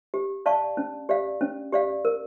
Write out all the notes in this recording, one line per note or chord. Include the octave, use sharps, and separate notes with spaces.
G4
D5 F5 A5 C#6
C#4
G4 D5 F5
C#4
G4 D5 F5
A#4